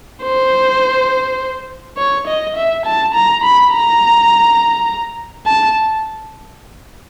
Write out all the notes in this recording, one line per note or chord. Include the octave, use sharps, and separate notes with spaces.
C5
C#5
D#5
E5
A5
A#5
B5
A#5
A5